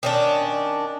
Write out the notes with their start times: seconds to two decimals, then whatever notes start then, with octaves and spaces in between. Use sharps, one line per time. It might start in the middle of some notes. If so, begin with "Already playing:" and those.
0.03 D#3 C#4 D4